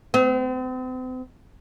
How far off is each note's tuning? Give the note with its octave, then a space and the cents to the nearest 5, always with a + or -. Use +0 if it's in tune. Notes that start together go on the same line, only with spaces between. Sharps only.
C4 -40